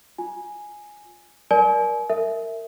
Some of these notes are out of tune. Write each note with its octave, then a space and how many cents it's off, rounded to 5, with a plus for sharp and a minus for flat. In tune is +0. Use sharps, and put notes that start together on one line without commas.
F4 +15 G#5 +0
A#4 +25 D5 +0 G#5 +40
A#4 -25 E5 +0